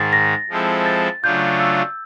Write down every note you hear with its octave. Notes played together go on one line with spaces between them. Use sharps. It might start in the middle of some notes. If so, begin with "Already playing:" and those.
Already playing: G#2 D#3 G#3 A6
A#6
F3 G#3 C4 E4 A4
A6
C#3 F#3 A3 D4 F4 G6
E6